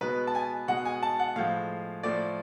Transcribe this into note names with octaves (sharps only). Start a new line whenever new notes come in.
B2 G#3 B4
A5
G#5
B2 G#3 F#5
G#5
A5
F#5
A2 F3 G#3 F5
A2 F3 A3 D5